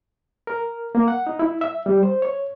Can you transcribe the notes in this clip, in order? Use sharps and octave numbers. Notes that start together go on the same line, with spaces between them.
A#4
A#3
F#5
D#4
E4
E5
G3
C5
C#5